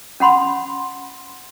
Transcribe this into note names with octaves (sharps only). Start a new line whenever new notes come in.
C#4 F#5 B5 C6